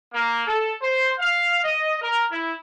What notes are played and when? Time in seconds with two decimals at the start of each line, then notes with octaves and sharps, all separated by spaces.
0.14 A#3
0.45 A4
0.81 C5
1.19 F5
1.63 D#5
2.01 A#4
2.31 E4